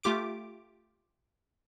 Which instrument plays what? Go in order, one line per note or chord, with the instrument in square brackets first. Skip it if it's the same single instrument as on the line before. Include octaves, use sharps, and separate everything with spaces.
[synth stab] A3 F4 G4 D6 D7